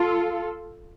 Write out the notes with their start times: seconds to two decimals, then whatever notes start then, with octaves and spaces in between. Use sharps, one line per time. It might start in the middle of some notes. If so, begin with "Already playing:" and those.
Already playing: F4 A4